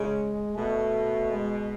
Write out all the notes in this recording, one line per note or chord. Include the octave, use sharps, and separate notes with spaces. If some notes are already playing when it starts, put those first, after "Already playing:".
Already playing: C#3 G#3
B2 A3
G#3